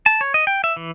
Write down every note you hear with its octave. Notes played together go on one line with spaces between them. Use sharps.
A5
C#5
D#5
G5
E5
E3